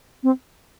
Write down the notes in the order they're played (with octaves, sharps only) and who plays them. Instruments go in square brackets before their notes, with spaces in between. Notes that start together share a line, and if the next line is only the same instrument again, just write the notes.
[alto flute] C4